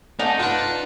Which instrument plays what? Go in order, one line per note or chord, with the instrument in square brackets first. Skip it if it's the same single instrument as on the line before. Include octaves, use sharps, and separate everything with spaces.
[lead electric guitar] A3 A4 [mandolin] D#4 [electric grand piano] D5 F#5 G#5
[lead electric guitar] D4 [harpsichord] F4 B4 [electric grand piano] F#5